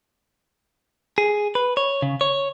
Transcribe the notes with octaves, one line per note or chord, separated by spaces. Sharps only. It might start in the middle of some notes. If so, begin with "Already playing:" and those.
G#4
B4
C#5
C#3
C#5